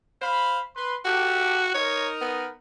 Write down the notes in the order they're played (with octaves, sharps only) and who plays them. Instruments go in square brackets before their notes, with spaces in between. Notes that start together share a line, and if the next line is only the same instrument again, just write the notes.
[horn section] C5 F5 B5
B4 C6
[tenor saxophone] F#4 [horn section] G4 A4
[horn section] D#4 A#4 [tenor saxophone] C#5
[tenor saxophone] B3